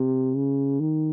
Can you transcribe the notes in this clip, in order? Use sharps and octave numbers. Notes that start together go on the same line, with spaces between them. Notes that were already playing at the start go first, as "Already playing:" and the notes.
Already playing: C3
C#3
D#3